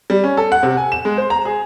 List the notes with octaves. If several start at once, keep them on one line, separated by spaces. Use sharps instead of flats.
G3
C#4
A4
F#5
C3
G#5
E7
G#3
C5
A#5
G#4